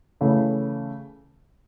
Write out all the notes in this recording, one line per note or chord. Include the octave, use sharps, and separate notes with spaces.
C#3 E3 A3